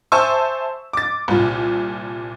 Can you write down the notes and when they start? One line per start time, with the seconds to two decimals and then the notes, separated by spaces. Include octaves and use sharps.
0.12 C5 E5 G#5 A5 C#6 E6
0.93 D6 A6
1.28 C2 A#2